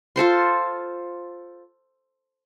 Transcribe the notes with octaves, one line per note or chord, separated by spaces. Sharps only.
F4 A4 C5 C6